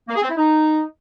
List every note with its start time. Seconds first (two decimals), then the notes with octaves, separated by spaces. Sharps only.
0.08 A#3
0.15 G#4
0.22 C4
0.30 E4
0.37 D#4